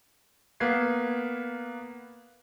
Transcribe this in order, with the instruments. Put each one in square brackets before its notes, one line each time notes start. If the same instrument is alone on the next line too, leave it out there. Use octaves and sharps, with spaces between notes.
[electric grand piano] A#3 B3 B4 G#6 C7